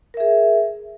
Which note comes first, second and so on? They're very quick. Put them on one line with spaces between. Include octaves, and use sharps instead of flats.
A#4 E5 G#4